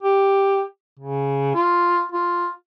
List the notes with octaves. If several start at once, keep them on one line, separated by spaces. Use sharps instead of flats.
G4
C#3
F4
F4